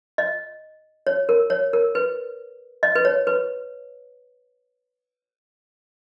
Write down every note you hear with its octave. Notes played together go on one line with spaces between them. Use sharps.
D#5
C#5
A#4
C#5
A#4
B4
D#5
B4
C#5
B4